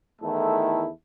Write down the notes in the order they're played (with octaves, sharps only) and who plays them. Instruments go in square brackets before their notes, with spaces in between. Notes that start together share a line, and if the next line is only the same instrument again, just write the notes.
[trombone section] E2 D#3 A3 E4 A4